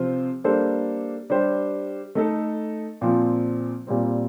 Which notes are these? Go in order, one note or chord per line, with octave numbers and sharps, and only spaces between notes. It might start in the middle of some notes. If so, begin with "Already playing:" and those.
Already playing: C3 F3 C4 F4 C5
G3 A#3 D4 A4 C5
G3 D4 G4 C5
A3 D#4 A4
A#2 F3 C4
A#2 G3 C4